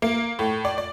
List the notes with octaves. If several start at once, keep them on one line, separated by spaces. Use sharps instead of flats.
A#3
A2
D5
D5